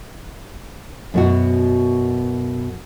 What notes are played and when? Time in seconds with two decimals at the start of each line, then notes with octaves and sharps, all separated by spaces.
1.14 F#2 B2 F#4